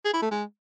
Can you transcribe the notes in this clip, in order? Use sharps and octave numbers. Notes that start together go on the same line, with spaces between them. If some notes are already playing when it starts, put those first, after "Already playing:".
G#4
E4
A3
G#3